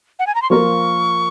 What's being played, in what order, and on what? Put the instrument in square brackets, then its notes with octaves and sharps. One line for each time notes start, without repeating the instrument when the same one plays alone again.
[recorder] F#5
G#5
A#5
C6
[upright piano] F3 A#3 F4 A#4 [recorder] C#6